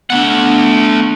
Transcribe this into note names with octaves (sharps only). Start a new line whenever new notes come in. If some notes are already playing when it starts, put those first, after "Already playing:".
A3 B3 D4 F#5